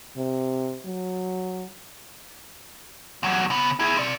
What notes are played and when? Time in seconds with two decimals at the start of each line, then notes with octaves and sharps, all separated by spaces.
0.17 C3
0.86 F#3
3.23 E2 F#3
3.50 C#3 B3
3.79 E4 G#4
3.97 C4 D5